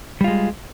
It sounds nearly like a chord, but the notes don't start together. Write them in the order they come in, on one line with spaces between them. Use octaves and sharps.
G3 F4 G#3